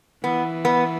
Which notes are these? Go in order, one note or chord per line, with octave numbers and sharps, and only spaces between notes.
E3 B3
B3